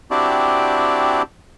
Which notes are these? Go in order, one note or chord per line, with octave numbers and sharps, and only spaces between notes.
C4 D4 E4 F#4 G4 D5